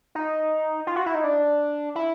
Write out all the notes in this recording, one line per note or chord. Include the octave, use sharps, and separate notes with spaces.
D#4
F4
F#4
E4
D#4
D4
E4